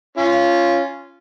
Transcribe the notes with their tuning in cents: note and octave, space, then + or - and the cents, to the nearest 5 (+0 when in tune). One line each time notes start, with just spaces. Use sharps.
C#4 +0 F4 -15